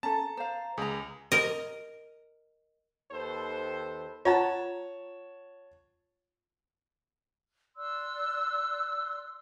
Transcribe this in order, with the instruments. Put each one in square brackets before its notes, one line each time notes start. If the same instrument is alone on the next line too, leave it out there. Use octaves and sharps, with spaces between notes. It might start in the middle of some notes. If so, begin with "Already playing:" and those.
[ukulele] C#4 A4 [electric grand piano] A5 [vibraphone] A#5
[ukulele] C5 F5
[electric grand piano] C#2 [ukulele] G#4 A#5
[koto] A#4 D#5
[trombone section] D#2 D#3 A4 B4 C5
[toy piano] F4 A#5 [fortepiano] C#5 F#5 A5
[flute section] D5 C6 E6 F#6